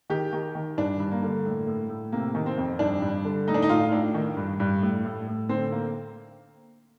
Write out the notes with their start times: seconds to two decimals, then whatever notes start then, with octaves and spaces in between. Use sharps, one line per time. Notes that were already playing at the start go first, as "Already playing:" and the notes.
0.10 D#3 G4
0.33 D#3
0.55 D#3
0.77 G2 D4
1.00 G2
1.11 A#3
1.22 D3
1.45 A2
1.67 A2
1.89 A2
2.12 C3 A#3
2.35 D#3
2.46 C4
2.57 F2
2.79 G2 D4
3.02 G2
3.25 D3
3.47 A2 D#4
3.54 D4
3.62 D#4
3.69 A2 F4
3.92 A2 D4
4.14 D#3
4.37 G2
4.60 G2
4.82 A2
5.04 A2
5.27 A2
5.49 D3 C4
5.72 A#3